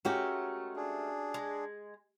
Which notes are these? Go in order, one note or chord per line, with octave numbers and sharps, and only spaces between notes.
G#3 A3 C#4 F#4 G4 A#4
D4 G#4
G#3